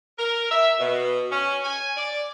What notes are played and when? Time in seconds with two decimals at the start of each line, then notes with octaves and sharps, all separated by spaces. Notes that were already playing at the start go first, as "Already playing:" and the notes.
0.18 A#4
0.50 E5
0.79 B2
1.31 C#4
1.64 G#5
1.97 D5